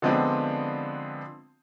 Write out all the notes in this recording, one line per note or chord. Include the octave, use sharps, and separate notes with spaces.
D3 F3 G#3 B3 C4 D4